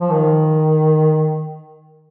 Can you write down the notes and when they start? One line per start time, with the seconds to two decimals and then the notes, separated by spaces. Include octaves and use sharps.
0.01 F3
0.10 D#3